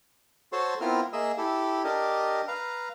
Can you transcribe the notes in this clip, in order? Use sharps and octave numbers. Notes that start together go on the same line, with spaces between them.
F#4 A4 C5 C#5 A5 C6
B3 C4 E4 F4 A#4 F6
A#3 G#4 D#5 E5 E6
E4 G4 A4
D4 G4 A#4 D#5
B4 F5 A#5